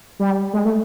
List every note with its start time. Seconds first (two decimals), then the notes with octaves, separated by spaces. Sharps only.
0.20 G3
0.53 G#3
0.65 A3